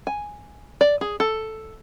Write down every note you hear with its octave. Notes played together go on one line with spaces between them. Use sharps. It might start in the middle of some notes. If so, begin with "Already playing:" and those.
G#5
D5
G#4
A4